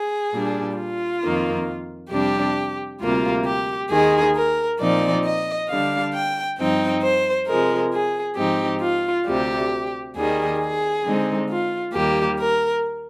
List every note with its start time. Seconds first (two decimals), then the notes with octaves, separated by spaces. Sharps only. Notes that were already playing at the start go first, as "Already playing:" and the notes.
Already playing: G#4
0.34 A#2 G3 D4
0.77 F4
1.23 F2 D#3 A#3
2.11 F2 C3 G3 D4 G4
3.01 D2 C3 G3 A#3 F4
3.45 G4
3.90 D#2 D#3 G#3 G#4
4.36 A#4
4.80 A#2 F3 C4 D#4 D5
5.25 D#5
5.69 D3 G3 D4 F5
6.13 G5
6.58 G2 F3 C4 D#4 G5
7.03 C5
7.47 C3 F3 G#3 A#4
7.93 G#4
8.37 G#2 F3 C4 D#4 G4
8.81 F4
9.26 D2 C3 G3 G4
10.15 D#2 D#3 G3 G#4
10.60 G#4
11.04 D3 G#3 C4 D#4
11.50 F4
11.93 D#2 D#3 G3 A#3 G4
12.39 A#4